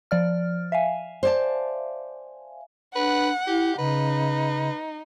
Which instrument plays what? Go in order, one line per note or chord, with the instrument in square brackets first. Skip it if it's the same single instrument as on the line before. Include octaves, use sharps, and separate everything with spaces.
[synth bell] F3 D5 F6
E5 F5 G#5
[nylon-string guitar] C5 D5 A5
[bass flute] D4 [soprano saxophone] B4 [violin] F#5
[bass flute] E4 [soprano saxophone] G4
[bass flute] C#3 [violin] D#4 [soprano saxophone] B4